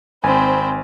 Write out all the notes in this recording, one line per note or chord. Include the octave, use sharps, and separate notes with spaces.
G#1 C4 C5 G#5 B5